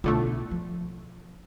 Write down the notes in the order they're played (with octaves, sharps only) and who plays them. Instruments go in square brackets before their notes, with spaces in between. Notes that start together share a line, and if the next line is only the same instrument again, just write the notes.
[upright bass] B1 F4 [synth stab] A2 D3 A3
[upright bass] F3